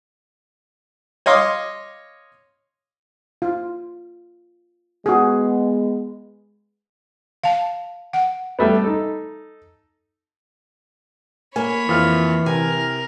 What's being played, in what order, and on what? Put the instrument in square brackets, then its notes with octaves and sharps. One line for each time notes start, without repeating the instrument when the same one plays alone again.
[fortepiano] C#5 D#5 F5 C6 D6 D#6
[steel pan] F4
[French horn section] G#3 B3 [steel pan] F#4 G#4
[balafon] F5 A5
F#5
[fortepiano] G3 A3 B3
D#4 A4
[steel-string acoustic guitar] A#3 [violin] C#5 B5 [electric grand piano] G#5
[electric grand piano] F2 F4 F6 [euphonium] E3
[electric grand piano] C3 [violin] A#4 [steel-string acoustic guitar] G#5